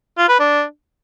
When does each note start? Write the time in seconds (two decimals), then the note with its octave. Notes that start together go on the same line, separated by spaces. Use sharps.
0.18 F4
0.29 B4
0.39 D4